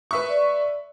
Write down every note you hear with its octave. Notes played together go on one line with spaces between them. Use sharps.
B4 E5 C#6
D5